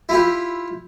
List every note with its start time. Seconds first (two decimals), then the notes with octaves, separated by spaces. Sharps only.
0.09 E4 F4 G4